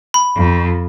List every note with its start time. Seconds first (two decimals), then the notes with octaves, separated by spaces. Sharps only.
0.14 B5
0.36 F2